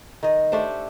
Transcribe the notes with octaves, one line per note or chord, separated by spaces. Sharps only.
D#3 D#5
A3 D4 G4 C5